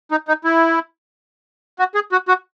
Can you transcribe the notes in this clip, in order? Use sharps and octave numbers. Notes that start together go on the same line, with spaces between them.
D#4
D#4
E4
F#4
G#4
F#4
F#4